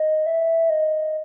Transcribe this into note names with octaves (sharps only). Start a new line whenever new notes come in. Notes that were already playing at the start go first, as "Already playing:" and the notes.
Already playing: D#5
E5
D#5